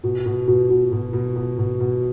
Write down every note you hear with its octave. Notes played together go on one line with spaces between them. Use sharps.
B2
B2
B2
B2
B2
B2
B2
B2
B2